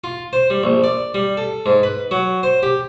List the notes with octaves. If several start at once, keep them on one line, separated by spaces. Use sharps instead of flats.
F4
C5
G3
A#1
D5
G3
A4
G#2
B4
F#3
C5
G4